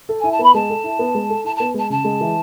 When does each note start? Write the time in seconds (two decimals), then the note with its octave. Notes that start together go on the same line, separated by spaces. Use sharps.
0.09 A4
0.20 E4 G#5
0.31 A5
0.39 B3 B5
0.54 G#3 A5
0.70 A4
0.84 E4
0.99 B3
1.15 G#3
1.30 A4
1.44 E4 A5
1.56 B3 A5
1.74 G#3 A5
1.90 C#3 A5
2.04 G#3
2.21 E3